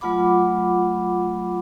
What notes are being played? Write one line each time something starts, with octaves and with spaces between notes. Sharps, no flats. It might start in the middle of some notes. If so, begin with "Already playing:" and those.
F#3 A3 F4 F#5 B5 D6